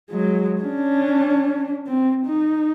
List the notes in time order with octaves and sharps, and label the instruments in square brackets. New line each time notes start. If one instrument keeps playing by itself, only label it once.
[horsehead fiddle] F#3 G#3
C#4 D4
C4
D#4